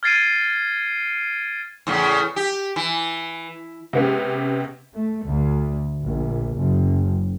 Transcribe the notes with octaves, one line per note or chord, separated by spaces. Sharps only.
F6 G#6 A6 C7 D7 D#7
E2 A2 C#3
G4
E3
C3 G#3 B3 C#4 G4
A3
D2
A#1
F#1